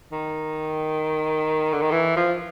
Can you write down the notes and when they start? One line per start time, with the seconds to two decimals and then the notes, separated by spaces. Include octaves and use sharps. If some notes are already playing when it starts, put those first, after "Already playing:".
0.12 D#3
1.73 D3
1.82 D#3
1.92 E3
2.17 F3